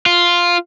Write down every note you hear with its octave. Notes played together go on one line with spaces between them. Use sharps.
F4